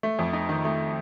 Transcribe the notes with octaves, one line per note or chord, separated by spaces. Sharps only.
A3
F2
D#4
D#3
A3